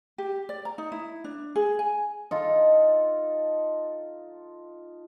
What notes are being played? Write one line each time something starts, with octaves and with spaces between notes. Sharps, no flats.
G4
D5
A#5
D#4
E4
D4
G#4
G#5
D#4 F4 A4